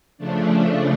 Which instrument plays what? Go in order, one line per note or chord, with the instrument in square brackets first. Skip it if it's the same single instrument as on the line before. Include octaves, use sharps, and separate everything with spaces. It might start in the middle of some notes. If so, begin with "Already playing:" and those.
[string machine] C#3 F3 A3 D4